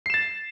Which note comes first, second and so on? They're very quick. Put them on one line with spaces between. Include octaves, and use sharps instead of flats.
C7 E7 A6